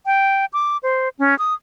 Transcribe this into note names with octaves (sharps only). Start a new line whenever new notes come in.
G5
D6
C5
C#4
D#6